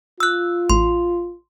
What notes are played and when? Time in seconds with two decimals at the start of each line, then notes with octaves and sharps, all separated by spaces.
0.20 F4 E6 F#6
0.70 A1 C6